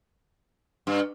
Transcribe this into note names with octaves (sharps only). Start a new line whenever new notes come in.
G2